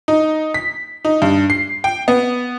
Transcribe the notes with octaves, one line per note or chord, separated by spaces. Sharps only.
D#4
B6
D#4
G2
C7
G5
B3